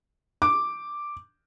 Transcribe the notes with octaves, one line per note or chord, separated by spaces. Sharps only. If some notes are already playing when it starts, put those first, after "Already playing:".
D6